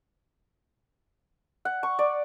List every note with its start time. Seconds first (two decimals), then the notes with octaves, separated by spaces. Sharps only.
1.65 F#5
1.83 C#6
1.99 D5